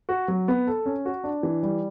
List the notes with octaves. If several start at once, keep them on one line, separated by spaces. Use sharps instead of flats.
F#4
F#3
B3
A4
C#4
F#4
D4
E3
G3